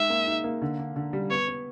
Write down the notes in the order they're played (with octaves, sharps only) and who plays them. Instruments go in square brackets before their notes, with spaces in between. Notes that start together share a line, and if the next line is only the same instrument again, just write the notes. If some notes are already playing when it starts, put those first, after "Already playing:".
Already playing: [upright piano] G#3 D#4 [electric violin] E5
[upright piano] A#3
D#4
A#3
D3
D3
D3
G3
[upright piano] B3 [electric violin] C#5
[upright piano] B3